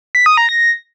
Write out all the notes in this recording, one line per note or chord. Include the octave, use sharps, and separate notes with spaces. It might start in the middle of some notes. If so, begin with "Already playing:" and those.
B6
D#6
A#5
A#6